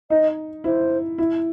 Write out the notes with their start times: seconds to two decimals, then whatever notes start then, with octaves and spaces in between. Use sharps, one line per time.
0.10 D#4 D#5
0.64 E4 C5
1.18 E4